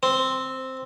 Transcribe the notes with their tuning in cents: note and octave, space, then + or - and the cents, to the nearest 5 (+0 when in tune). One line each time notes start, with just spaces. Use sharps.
C4 +0